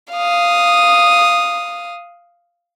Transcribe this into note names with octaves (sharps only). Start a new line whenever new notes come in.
F5 D#6